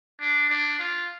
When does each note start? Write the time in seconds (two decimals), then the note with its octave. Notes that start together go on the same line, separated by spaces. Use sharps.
0.20 D4
0.49 D4
0.79 F4